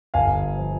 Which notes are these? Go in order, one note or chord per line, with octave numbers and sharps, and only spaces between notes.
G1 F5 G#5
F3